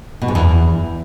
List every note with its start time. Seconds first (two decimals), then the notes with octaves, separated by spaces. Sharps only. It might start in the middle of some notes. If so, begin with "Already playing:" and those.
0.21 B2
0.28 G#2
0.35 E2